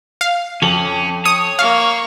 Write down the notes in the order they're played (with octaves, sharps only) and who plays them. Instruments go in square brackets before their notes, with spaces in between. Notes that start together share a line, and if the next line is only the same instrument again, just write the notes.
[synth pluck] F5
[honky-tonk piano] F2 F#7 [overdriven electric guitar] C#4
[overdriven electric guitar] C#5 [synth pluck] D#6
[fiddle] A#3 C#6 [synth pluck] F5